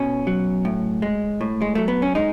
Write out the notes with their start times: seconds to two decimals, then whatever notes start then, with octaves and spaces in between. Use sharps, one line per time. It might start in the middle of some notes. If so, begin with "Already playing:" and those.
Already playing: B2 C#4
0.27 F#3
0.65 A2
1.02 G#3
1.41 A2
1.62 G#3
1.75 F#3 A3
1.88 B3
2.02 C#4
2.15 G#3 D#4